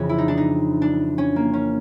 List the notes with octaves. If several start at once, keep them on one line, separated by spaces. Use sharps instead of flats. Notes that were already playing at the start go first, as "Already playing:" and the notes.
Already playing: F2 C#3 E3 C#4
E4
D#4
D4
D#4
D4
C#4
A#3
C#4